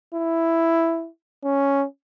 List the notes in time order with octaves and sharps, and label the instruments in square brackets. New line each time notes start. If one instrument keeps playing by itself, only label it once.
[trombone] E4
C#4